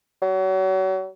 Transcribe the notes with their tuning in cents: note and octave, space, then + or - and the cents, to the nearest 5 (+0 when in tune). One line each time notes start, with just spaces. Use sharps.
F#3 +35